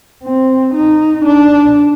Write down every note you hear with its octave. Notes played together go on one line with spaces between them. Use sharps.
C4
D#4
D4